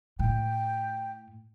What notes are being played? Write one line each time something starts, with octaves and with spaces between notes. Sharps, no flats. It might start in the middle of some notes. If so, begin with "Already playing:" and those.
A2 G5